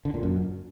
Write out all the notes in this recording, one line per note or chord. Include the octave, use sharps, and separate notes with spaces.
D3
A#2
F#2